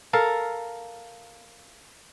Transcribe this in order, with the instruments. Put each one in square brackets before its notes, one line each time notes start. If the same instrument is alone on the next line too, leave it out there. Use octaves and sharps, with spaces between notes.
[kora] A4 A#4 F5